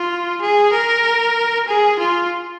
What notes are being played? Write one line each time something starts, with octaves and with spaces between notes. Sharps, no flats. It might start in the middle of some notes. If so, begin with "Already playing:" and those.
Already playing: F4
G#4
A#4
G#4
F4